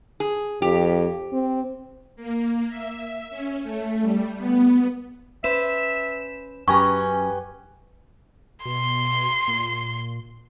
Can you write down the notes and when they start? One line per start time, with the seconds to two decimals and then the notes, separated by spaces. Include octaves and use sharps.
0.20 G#4
0.62 F2 G4
1.33 C4
2.16 A#3
2.69 E5
3.30 C#4
3.63 A3
4.02 G3
4.37 B3
5.44 C#4 B4 C5 E5 E7
6.68 F#2 C#4 G4 B4 G#5 A#5 C#6
8.65 B2 C6
9.48 A#2